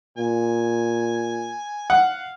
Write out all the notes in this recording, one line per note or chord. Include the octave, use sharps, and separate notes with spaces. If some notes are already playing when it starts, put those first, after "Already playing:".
A#2 G#5
F5 F#5